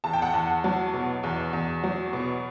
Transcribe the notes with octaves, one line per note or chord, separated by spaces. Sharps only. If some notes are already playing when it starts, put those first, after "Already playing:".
E2 A5
G5
F#5 A5
E2
F#3
B2
E2
E2
F#3
B2